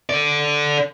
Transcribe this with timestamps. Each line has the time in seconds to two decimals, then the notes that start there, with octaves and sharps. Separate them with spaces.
0.10 A4 D5